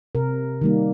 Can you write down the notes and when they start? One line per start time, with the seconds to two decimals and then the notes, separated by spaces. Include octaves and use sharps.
0.15 C3 A#4
0.61 D#3 G3 A#3